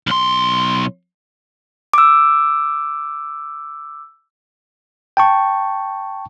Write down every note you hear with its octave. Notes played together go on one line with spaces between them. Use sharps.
B1 C6
D6 E6
G5 A5 C#6